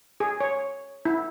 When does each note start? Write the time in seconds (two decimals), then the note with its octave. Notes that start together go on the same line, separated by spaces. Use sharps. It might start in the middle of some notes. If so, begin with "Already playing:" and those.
0.20 G#4
0.40 C#5
1.05 E4